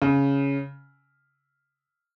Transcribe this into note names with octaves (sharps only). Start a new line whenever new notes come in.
C#3